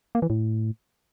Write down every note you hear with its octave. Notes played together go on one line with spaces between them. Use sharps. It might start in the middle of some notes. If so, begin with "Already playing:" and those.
A#3
E3
A2